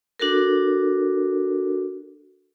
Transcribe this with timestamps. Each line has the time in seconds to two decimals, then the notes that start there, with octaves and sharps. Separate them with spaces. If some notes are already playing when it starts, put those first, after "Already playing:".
0.20 D4 F#4 A4 A#4